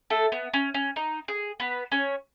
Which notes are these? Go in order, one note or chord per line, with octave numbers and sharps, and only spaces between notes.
A3 A4
B3
C#4
C#4
D#4
G#4
B3 B4
C#4 C#5